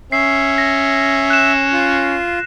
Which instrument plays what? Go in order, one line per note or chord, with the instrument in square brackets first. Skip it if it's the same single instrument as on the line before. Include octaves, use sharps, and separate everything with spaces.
[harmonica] C#4 [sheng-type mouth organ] E5 [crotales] C7
[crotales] A#6
F#6 E7
[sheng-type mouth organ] F4